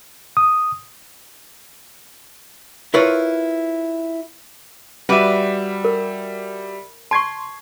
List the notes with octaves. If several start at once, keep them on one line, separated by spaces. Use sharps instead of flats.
D#6
E4 F4 A#4 B4 C#5
G3 F#4 B4 D5 E5
A#4
A5 C6 C#6 G#6 C7